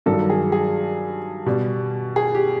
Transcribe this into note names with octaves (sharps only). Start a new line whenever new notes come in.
G2 D#3 F#3 A4
G#4
G#4
B2 G3
G#4
G4